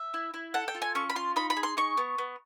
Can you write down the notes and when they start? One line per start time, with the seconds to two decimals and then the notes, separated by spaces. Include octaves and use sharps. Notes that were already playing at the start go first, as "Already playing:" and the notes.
Already playing: E5
0.14 E4
0.34 E4
0.54 A4 F#5
0.68 G5
0.75 F4
0.82 G#5
0.95 C#4 C#6
1.10 B5
1.15 F4 C6
1.36 D#4 B5
1.50 B5
1.57 G#4
1.63 C6
1.77 D#4 C#6
1.97 B3
2.18 B3